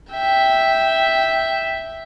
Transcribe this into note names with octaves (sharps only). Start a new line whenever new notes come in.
E5 G5